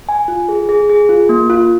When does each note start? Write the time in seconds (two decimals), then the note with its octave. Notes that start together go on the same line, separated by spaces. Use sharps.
0.09 G#5
0.28 F4
0.49 G#4
0.69 G#4
0.90 G#4
1.09 F4
1.29 A#3
1.50 F4